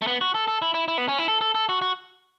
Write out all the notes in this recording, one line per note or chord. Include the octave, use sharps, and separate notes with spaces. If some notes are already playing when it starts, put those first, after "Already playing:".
A3
B3
F#4
A4
A4
E4
E4
E4
B3
C#4
E4
A4
A4
A4
F#4
F#4